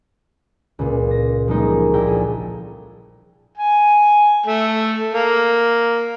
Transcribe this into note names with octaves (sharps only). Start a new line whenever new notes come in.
C#2 A#2
A#6
F3 G3 G#3 A#3 D#4 G4
A#1 E4 G5 A#5
G#4 A4
G#5
A3
A#3